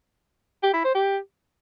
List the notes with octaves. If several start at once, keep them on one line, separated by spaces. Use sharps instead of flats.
G4
E4
C5
G4